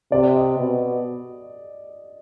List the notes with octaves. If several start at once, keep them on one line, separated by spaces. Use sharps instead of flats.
C3 D5
D#5
B2